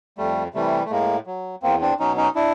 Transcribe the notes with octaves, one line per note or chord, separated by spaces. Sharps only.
F2 G3 A3
C3 E3 G3 A3
A3
A2 G#3 A#3
F#3
E2 A#3 C4
C4 D4
B2 F#3 C#4 D#4
C#4 D#4
D4 E4